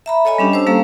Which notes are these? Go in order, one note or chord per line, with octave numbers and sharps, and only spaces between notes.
E5 A#5 B5
A4 C#5 D#5 G#5 B5
G3 C#4 D4 G4
C5 A5 E6
G3 A#3 C#4 A4 F5 A#5